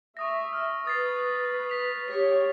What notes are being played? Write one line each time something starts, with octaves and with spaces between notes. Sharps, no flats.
E5 C#6 D#6 A#6
F6
B4 D#6 A6 C7
B6 F7
G4 C#5 B6